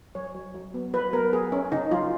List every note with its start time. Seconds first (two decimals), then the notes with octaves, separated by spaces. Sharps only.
0.15 F#3 C#5
0.35 F#3
0.55 F#3
0.74 B3
0.94 F#3 B4
1.13 B3 A#4
1.32 B3 G#4
1.52 B3 C#4
1.72 C#3 D#4
1.91 F#3 F4